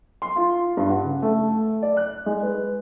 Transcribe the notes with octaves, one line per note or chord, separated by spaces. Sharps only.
C6
F4
G2
F#5
C#3
A3
D5
F#6
G#3
B4